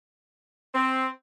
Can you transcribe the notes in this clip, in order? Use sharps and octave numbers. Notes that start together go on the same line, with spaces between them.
C4